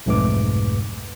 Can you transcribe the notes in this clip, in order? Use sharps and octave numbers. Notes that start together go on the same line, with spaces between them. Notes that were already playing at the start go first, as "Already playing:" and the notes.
B1 F2 G#2 A3 B4 D6